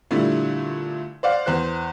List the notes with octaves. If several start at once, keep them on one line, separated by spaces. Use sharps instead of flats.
A#2 D3 G3 A3 E4
C5 D5 F5 F#5
E2 C5 F#6